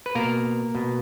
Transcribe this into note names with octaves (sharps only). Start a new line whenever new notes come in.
B4
B2 A#3 A#4
B2